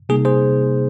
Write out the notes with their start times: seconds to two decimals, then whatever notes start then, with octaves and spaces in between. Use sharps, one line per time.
0.09 C3 G3 A#3 D#4 G#4
0.25 G#4 C5